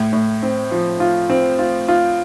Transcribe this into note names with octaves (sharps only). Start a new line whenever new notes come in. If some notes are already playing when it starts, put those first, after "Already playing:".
Already playing: A2
A2
C4
F3
F4
C4
F4
F4